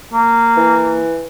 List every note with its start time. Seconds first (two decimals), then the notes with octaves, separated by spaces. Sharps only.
0.13 A#3
0.56 E3